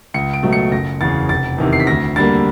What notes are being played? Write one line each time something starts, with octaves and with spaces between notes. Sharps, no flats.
C#2 C#7
D7
B2 F#3 A3
C#7
F#1 A#6
E2 C#3 A6
F1 A6
E2 C3 D#3
C7
B6
D2 A#6
D3 G3 A#3 A6